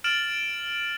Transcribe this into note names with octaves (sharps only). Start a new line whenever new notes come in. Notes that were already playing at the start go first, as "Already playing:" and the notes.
F6 A6 D7 E7 F#7